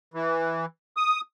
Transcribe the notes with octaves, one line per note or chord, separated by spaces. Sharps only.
E3
D#6